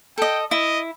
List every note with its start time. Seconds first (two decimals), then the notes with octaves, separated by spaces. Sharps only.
0.18 A4 D#5 G5
0.51 E4 D#5